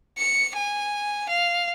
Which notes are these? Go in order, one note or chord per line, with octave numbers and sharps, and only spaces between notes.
C#7
G#5
F5